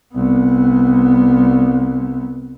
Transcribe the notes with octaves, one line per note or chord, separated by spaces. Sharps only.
C2 B3